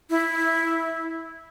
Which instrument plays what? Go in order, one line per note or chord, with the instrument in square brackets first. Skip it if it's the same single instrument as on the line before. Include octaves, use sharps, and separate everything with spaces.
[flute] E4